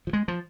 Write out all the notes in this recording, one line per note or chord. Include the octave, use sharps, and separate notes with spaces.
F3
G#3
F3